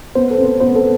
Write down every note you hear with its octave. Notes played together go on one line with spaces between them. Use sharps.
B3 C5
A4
C4
C5
B3 C5
A4